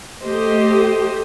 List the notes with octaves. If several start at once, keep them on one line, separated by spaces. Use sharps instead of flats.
A3 G4 C5 D#5